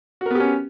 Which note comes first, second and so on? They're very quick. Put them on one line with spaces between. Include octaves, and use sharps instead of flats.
F#4 A#4 B3 G4 C#4